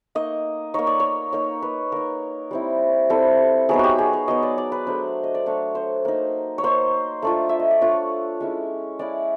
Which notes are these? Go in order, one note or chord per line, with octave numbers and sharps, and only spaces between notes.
A#3 D#4 D#5
A#3 D#4 C#5
D5
C#5
A#3 D#4 C#5
B4
A#3 D#4 A#4
G3 C4 E4
G3 C4 E4 A4
F#3 B3 D#4 G#4
F#4 G4
G#4
C#5
F#3 B3 D#4 D#5
D5
D5
B4
F#3 A3 D4 C5
D#5
D5
F#3 A3 D4 C#5
C5
A#3 D#4
C#5
A#3 D#4 C5
A3 D4 F4
E5
D#5
D5
A3 D4 F4 C#5
G#3 C#4 E4
G#3 C#4 E4 D5